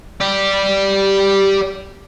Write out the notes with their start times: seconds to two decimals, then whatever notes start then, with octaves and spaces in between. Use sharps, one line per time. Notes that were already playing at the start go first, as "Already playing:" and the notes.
0.20 G4 D5